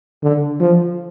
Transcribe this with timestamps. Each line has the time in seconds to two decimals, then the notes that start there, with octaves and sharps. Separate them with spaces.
0.23 D3
0.60 F3